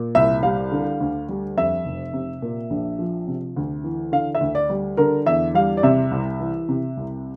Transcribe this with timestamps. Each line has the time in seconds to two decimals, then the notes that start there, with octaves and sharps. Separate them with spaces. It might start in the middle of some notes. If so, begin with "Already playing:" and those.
Already playing: A#2
0.15 C2 E5
0.43 G3 F5
0.72 D3
1.00 D2
1.29 G3
1.57 F2 E5
1.85 F1
2.13 C3
2.42 A#2
2.70 A#1
2.99 F3
3.28 C3
3.56 D2
3.84 E3
4.12 D3 F5
4.35 E5
4.41 D2
4.55 D5
4.69 G3
4.97 D3 A#4
5.26 E2 E5
5.54 G3 F5
5.77 D5
5.83 C3 E5
6.11 C2
6.40 E3
6.69 C3
6.97 C2